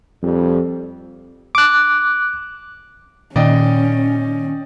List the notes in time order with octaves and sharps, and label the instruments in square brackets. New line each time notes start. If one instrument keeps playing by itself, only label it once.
[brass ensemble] F2 G3
[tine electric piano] D6 F#6
[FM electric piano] A#2 D#3 [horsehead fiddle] C#4 [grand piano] D5 D#5 G5